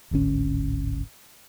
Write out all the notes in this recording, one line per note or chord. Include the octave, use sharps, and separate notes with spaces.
D1 G#1 D3 C#4